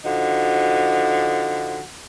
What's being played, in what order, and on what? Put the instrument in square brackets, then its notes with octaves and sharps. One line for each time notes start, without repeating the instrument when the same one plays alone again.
[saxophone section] D3 F3 D#4 F#4